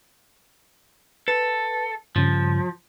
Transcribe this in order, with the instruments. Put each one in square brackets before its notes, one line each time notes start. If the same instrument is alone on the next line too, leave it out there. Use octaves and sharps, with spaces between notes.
[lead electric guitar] A4 [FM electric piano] B4
[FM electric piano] G2 C#3 [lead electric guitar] F3